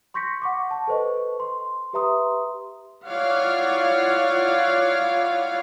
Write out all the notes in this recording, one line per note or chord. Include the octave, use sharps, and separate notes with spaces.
C6 C#6 G6 A#6 B6 C#7
F#5 C#6 D6
A5
A4 B4 C5 D#5 C#6
C6
G4 B4 E5 A#5 C6 D#6
E4 F4 C#5 D5 F5 F#5